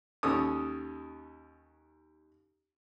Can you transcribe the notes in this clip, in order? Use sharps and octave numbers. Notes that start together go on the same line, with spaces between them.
D#2 C#4 A4 D#6